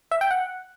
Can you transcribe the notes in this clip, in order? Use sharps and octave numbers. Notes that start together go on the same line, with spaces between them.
E5
G5
F#5